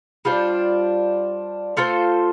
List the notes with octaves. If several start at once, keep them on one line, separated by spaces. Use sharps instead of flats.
G3 D4 F4 C5
A3 F4 A4 C5